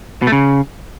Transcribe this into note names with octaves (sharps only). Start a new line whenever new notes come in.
B2
A3
C#3